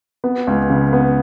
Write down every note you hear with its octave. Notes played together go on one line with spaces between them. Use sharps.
B3
C#2
C#3
B3